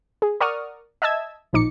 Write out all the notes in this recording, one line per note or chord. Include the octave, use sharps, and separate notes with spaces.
G#4
A#4 D5 F#5 C#6 D#6 F6
D#5 E5 A5 E6 G#6
A1 A#2 F3 D#4 D6 C#7